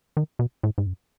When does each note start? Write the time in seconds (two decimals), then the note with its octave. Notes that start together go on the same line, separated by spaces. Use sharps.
0.17 D#3
0.39 B2
0.63 A2
0.78 G#2
0.86 F#2